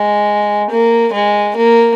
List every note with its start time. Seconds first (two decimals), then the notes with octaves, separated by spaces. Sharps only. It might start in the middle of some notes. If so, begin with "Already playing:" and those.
Already playing: G#3
0.70 A#3
1.13 G#3
1.56 A#3